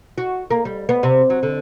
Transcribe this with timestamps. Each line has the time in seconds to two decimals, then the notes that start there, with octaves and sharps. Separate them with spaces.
0.18 F#4
0.50 A#3
0.65 G3
0.89 B3
1.03 C3
1.30 F#3
1.43 D3